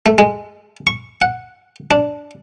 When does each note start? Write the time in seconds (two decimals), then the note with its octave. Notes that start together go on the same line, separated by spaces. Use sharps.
0.06 A3
0.18 G#3
0.87 C#6
1.22 F#5
1.91 D4